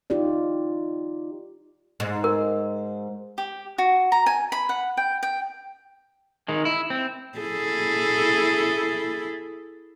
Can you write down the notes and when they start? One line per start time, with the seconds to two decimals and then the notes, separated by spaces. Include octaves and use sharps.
0.10 D#4 F4 G4 D5
2.00 G#2
2.24 A#4
3.38 G4
3.78 F#4
4.12 A#5
4.26 G#5
4.52 B5
4.69 F#5
4.97 G5
5.23 G5
6.48 D#3 G#3
6.65 E4
6.90 C4
7.38 E4 G#4 A4